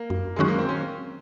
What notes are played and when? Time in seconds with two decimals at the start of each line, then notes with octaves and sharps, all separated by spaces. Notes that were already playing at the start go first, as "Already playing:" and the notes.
Already playing: A#3
0.10 F#2
0.36 D#3 F#3 G#3 C#4 F#4
0.48 A#3
0.58 C4
0.69 C#4